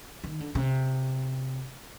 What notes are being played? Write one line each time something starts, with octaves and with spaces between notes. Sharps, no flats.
D#3
D3
C3